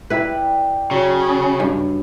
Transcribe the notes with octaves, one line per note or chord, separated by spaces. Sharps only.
G3 E4 G4 B4
C#3 F#3
G2